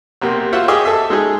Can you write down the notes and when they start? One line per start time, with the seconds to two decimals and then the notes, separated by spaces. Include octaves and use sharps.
0.21 B1 C3 A#3
0.53 F4 F#4 C5 E5 F#5
0.68 G4 G#4 D#5 D#6
0.85 A4 E5
1.10 G#3 D#4 G#4